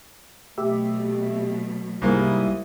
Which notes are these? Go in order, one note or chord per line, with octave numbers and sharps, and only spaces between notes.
B2 F#3 A3 G4 E5
C2 G#2 G3 A#3 E4 D#6